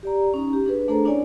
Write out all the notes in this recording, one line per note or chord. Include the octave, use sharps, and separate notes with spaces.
G4 D5 A#5
C#4 D#4 A#5
G4
D4 G#4 B4
A3 D4 G#4 A4 C5 A#5
C#4 D4 E4 C#5 D5 G#5